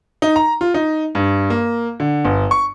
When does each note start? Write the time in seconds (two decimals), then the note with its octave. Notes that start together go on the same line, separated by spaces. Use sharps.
0.22 D#4
0.36 A#5
0.61 F4
0.74 D#4
1.15 G2
1.50 A#3
2.00 D3
2.25 G1
2.51 C#6